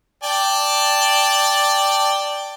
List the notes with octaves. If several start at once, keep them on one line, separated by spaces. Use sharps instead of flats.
D5 G5 A5